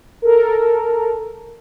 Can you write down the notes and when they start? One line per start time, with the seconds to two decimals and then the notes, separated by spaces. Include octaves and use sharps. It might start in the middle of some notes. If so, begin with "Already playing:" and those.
0.22 A4 A#4